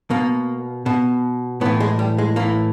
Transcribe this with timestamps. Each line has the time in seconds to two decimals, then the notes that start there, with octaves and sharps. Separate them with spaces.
0.10 B2 A#3
0.86 B2
1.61 A2 B3
1.66 E3
1.80 G#3
1.99 G3
2.18 G#3
2.36 A2 E3 A#3